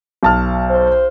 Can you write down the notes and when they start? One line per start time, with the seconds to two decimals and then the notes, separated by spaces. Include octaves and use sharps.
0.23 B1 A5 F6
0.70 C5